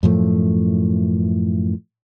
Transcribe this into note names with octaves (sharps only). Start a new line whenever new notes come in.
F#2 A2 F3 A3